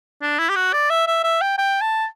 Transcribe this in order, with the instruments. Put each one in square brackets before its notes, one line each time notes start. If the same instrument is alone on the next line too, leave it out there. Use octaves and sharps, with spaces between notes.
[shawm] D4
E4
G4
F#4
D5
E5
E5
E5
G5
G5
A5